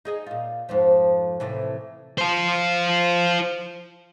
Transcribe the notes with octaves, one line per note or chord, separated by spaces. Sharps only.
D#4 G#4 D#5
A#2 F4
F2 G#2 F3
A2 C3 E3
F4 C5